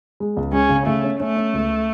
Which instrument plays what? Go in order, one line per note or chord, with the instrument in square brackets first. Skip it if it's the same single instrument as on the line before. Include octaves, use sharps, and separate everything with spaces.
[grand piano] G#3
C#2
[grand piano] G#3 [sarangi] C#4
[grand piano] C#3
[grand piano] C#3 [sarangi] A3
[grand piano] C#4
[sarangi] A3 [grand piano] C#4
[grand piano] C#4
C#2